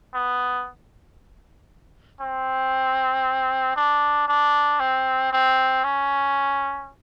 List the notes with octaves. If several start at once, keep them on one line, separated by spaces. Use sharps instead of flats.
B3
C4
D4
D4
C4
C4
C#4